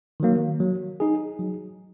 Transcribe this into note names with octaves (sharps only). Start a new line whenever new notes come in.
D#3 F#3 A#3
F#3
D#4 G#4
F#3